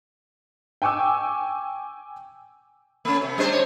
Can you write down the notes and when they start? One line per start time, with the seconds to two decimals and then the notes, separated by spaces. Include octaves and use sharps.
0.82 G5 G#5 C#6 D6 E6
3.05 A3 C#4
3.22 C3
3.38 G3 D4 C5
3.52 C#5